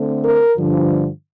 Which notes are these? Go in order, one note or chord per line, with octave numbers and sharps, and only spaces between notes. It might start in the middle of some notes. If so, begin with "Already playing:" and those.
Already playing: D3 A3 C4
A#4
G2 D3 F3